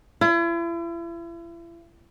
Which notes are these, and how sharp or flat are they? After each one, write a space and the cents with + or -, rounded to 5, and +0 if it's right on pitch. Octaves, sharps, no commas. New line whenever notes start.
E4 +40